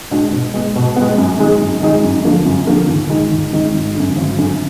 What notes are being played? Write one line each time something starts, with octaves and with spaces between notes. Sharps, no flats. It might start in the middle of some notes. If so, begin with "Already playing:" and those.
G#3 D4 F#4
B2
G#3 B3
B2
G#3 B3
F#2
D#3 G#3 D#4 G#4
F#2
D#3 G#3 D#4 G#4
F#2
D3 F3 A#3
F#2
D3 F3 A#3
D#2
D#3 G#3 D#4
D#2
D#3 G#3 D#4
G#1
F#2 D3
G#1
F#2 D3